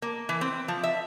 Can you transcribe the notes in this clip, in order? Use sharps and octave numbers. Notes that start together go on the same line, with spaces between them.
A#3
E3
C4
F3
E5